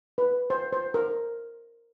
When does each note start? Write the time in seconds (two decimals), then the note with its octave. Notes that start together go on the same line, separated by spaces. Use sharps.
0.18 B4
0.50 C5
0.73 C5
0.94 A#4